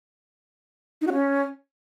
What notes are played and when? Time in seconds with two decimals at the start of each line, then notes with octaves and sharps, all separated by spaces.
1.01 D#4
1.07 F#4
1.13 C#4